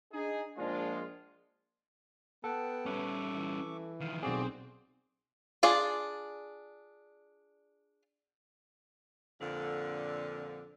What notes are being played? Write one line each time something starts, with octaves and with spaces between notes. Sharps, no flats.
D4 D#4 G#4
A#1 G#3 D4 F4
B3 A4 F#5 G5 A5
G3 C#4 E5 C#6 D6
E3
D#3 F3 F5
B1 A#3 C4 F#4 G#4 D5
D4 F4 G#4 D5
F2 A#2 D3